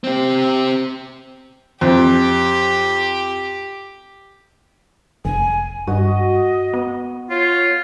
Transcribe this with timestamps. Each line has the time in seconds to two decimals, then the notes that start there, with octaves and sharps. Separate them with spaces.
0.04 C4 G4
1.81 F2 G4
5.25 F1 G#5
5.87 G2 F#4 D#5
6.74 B3
7.30 F4 C#5